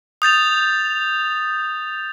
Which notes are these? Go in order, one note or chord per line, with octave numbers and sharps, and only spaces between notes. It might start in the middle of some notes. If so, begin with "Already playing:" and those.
D#6 G6 A6 F7